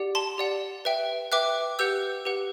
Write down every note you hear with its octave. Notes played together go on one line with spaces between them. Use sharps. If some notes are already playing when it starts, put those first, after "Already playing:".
Already playing: G4 D5 F#5
A5 C6
G4 D5 F#5
B4 E5 G5
B4 E5 G5 D6 F#6
G4 B4 F#5 E6 G6
G4 B4 F#5